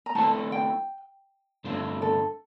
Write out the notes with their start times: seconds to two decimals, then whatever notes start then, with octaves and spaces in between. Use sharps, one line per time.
0.06 A#5
0.15 A3 C4 E4 A4 C5 A5
0.52 G5
1.64 G2 D3 A3 C4 F4
2.02 A4